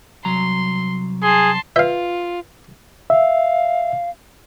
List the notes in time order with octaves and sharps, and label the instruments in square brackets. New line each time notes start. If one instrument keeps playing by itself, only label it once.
[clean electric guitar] C2 F#3 A#5 [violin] C6
[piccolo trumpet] G#4 [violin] A5 C6
[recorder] F4 [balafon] B4 [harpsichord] E5 F5
[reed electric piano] E5 [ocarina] F5